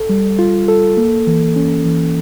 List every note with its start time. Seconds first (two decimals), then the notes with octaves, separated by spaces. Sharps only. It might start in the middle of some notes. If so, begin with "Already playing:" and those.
Already playing: A4
0.09 G3
0.39 F4
0.68 A4
0.97 A#3
1.27 E3
1.56 C#4
1.85 E3